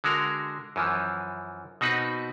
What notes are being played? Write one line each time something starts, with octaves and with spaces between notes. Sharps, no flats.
D3 G#3 F#4 A#4
F#2 E3 F3
B2 C4 D#4 F#4 B4